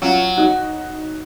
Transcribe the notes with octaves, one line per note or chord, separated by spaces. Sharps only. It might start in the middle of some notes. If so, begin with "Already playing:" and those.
F#3 C#4 F4
D#4 F#4